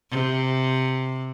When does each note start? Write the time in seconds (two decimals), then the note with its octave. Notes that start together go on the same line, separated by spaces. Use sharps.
0.11 C3